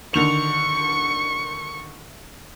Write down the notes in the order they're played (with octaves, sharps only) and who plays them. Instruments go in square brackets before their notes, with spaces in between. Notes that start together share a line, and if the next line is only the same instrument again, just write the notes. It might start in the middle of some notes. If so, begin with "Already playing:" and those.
[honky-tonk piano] D3 D#3 F7 [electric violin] C#6 C#7